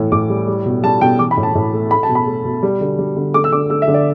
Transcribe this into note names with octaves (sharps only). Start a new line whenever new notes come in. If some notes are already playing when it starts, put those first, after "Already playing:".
Already playing: A2 E3
A2 D6
G3
G3
B2
G3 A5
B2 G5
E3 D6
B5
A2
A5
A2
A3
A3 B5
A5
B2
B5
A3
B2
G3
D3
G3
D3
A3 D6
E6
D3 D6
A3 E6
E5
D3
D5